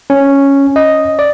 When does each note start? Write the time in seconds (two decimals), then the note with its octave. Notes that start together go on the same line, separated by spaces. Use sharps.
0.10 C#4
0.76 D#5
1.19 D5